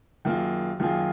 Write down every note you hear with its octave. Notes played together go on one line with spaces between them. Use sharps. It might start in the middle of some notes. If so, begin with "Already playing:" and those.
F#2 D#3 A#3 F4 G#4
F#2 D#3 A#3 F4 G#4